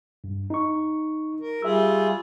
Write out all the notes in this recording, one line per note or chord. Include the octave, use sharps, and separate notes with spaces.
G2
D#4 C#6
A#4
G3 F4 G#4 E5 E6